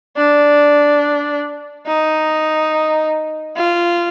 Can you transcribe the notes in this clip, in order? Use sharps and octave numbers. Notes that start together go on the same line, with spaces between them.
D4
D#4
F4